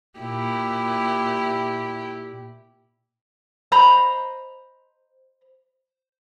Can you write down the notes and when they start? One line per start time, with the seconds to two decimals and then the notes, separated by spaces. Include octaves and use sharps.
0.19 A#2 E4 G4
3.72 C5 D#5 A#5 B5